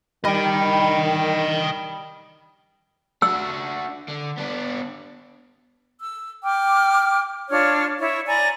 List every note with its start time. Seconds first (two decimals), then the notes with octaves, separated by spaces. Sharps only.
0.25 D#3 G3 D#5 G5
3.22 D4 F#4 E6
4.08 D3
4.37 B3 D4
5.99 E6
6.43 G5 D6 F6
7.49 D4 F4 C#5 F6
7.99 E4 C#5
8.27 D5 G#5 A#5 B5